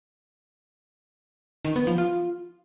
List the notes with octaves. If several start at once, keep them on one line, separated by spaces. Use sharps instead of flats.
D#3
B3
F3
F4